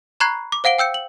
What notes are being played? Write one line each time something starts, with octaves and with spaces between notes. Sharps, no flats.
A#5 B5 C#6 F#6 G#6 C7
D6
C5 F5 F#5 D7 G7
G5 E6 G6 C#7
F#7